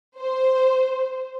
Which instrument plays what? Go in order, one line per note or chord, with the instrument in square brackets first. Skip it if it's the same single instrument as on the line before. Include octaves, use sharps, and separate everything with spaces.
[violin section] C5